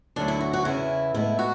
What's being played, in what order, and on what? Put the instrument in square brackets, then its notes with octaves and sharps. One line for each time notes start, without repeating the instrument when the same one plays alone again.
[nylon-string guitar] D2 D3 F#3 [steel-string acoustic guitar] D4
[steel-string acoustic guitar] E4
F#4
F#4
[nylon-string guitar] E2 C#3 E3 [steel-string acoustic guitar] E4
[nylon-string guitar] A2 G#3 B3 [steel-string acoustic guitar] E4
[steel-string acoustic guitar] F#4